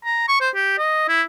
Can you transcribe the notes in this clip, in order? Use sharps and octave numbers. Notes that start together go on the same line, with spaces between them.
A#5
C#6
C5
G4
D#5
E4